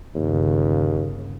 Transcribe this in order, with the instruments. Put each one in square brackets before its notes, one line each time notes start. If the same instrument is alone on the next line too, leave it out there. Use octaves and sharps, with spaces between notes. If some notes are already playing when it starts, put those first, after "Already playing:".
[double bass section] G1 C#3 [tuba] D#2